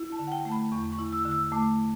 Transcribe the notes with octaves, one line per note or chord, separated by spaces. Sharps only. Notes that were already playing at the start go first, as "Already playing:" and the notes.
Already playing: E4
A5
D3
F#5
G5
A3
B5
E2 C#6
C#6
E4
E6
D3
E6
A3 D6